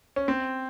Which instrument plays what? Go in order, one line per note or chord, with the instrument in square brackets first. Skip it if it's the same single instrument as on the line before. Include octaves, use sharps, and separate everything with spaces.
[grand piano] C#4
C4